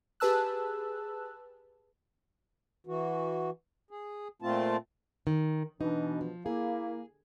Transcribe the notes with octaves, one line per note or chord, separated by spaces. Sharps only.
G4 G#4 B4 A5 E6 F#6
E3 F#4
G#4
A#2 A3 C4 F4 A5
D#3
B2 E3 D4 D#4
F3
A#3 E4 G#4